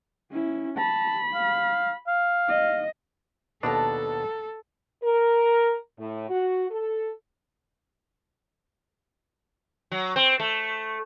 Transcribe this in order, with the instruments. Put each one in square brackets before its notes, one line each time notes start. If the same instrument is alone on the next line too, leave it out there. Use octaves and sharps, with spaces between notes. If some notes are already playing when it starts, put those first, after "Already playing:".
[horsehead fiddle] C#4 E4
[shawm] A5 [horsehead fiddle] B5
[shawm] F5
F5
[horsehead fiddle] D#5
[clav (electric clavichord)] D#2 B2 D4 [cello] A4 [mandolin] F#5 A5 A#5
[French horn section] A#4
A2
F#4
A4
[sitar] F#3
C4
A3